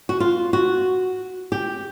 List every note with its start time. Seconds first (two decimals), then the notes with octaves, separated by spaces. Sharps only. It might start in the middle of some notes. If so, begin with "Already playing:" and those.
0.09 F#4
0.20 F4
0.53 F#4
1.52 G4